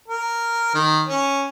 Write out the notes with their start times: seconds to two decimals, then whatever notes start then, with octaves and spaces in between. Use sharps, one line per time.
0.08 A#4
0.74 D#3
1.06 C#4